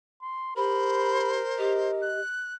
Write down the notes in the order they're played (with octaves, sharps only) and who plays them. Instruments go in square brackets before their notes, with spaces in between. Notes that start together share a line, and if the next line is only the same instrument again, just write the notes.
[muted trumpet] C6
[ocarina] G4 [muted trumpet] A#4 [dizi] C5 [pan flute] B5
[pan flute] G4 [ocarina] D#5
[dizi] F#6